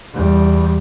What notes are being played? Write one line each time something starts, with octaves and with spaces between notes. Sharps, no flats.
E2 G3